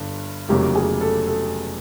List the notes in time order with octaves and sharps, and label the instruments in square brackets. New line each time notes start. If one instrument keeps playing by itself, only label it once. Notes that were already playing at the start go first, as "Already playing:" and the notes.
Already playing: [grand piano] G1 G2 D3
[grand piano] F1 E2 C#3 F#3 A#3 [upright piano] G4
[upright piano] G#4
A4
A4